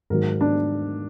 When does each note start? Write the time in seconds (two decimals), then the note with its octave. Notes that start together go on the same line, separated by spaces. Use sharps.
0.10 G#2 D#3 F#3 A#4
0.41 D4